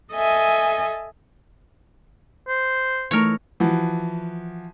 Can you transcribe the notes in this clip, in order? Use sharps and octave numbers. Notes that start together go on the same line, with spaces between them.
A4 D#5 E5 G#5
C5
E3 A3 D#4 A#4 C#5
E3 F3 F#4